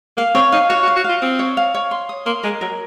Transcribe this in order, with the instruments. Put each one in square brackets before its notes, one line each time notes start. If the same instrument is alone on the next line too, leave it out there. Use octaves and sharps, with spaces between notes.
[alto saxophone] A#3 [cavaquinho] F5
[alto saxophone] C4 [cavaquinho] C#5
[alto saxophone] D#4 [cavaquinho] F5
[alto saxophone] F#4 [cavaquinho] C#5
[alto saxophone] F#4
[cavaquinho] F5
[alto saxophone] F#4
[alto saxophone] F4 [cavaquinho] F5
[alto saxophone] C4 [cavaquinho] D#6
[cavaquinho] C#5
F5
C#5
C6
D#6
[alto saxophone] A#3 [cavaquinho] C6
[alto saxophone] G#3 [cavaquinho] A#4
[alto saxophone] F#3 [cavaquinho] A#4